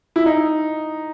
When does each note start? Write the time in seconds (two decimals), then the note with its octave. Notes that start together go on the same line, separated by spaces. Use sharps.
0.16 E4
0.26 D#4